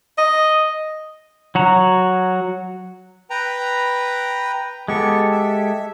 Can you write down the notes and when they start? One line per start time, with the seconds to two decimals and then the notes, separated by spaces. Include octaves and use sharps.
0.18 D#5
1.55 F#3 F#4 A#5
3.30 B4 G5 A#5
4.88 G#3 B3 G4 A4 C#6
5.32 E5